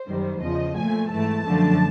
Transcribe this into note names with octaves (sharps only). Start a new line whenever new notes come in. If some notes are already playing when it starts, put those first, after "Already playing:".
Already playing: C5
F#2 D#3 G3
E2 C#3 F3 D#5
A#2 F3 A3 G#5
G#2 E3 A3 A5
F#2 D3 F3 A3